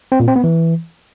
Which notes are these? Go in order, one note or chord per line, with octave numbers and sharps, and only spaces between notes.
C4
A#2
C4
B3
E3